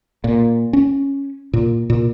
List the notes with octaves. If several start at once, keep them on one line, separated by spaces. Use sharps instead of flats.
A#2
C#4
A#2
A#2